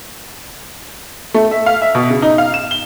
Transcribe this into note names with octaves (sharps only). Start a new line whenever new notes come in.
A3
E5
F5
E5
B2
C#3
D#4
F5
E7
G7